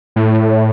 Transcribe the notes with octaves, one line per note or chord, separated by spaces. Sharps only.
A2